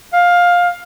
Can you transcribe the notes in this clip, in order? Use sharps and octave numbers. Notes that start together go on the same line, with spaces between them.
F5